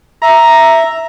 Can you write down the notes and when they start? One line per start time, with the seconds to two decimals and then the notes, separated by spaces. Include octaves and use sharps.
0.22 E5 A#5